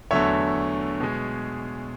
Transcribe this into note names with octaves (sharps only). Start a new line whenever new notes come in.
E2 D3 F#3 A3 C#5 E5
B2 G#3